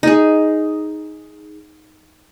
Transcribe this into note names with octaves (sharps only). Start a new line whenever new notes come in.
D#4 G#4